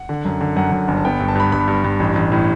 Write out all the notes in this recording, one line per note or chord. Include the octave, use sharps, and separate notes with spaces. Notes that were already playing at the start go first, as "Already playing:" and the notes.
Already playing: F#5
D3
F#2
D3
F#2 F#5
F#2
G1
A5
B3 G5
G2
A5
G2 B5
G2 B5
G2
G2
A1
A1
A2